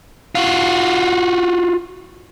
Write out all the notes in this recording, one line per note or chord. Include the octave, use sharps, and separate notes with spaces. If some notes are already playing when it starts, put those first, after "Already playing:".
F4 F#4